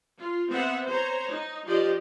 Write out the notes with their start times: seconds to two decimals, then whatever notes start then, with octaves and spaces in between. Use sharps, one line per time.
0.18 F4
0.48 B3 C4 E5 F#5
0.87 C5 C#5 A#5
1.29 D#4
1.67 F3 G4 D5 D#5